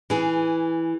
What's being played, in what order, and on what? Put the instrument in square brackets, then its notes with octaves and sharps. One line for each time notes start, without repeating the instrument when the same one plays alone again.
[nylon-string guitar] E3 G#4